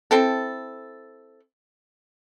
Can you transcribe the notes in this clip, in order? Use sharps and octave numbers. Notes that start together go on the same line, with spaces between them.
C4 E4 A4